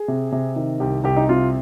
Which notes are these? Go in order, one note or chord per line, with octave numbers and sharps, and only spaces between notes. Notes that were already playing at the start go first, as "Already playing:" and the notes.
Already playing: G#4
C3
C3
D#3
C2 G4
C2 G4
D#4
C3 F4